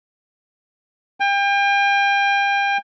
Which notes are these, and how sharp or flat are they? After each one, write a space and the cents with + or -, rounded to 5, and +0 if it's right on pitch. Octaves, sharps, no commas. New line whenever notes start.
G5 +35